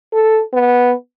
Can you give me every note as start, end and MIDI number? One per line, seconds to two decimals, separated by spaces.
0.13 0.41 69
0.53 0.93 59